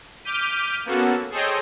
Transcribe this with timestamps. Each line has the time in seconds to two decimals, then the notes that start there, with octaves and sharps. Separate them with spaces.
0.25 D6 F6 G6 B6 D#7
0.85 A#3 B3 C#4 F#4 A4
1.31 G#4 A4 C5 C#5 D#5 G5